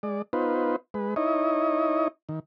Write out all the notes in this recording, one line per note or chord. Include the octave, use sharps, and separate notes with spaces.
G#3 D5
B3 D#4 F4 B4 C5
G#3 B4
D#4 E4 C#5 D#5
D#3